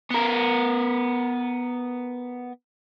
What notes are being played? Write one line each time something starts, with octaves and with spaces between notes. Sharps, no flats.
B3 A#4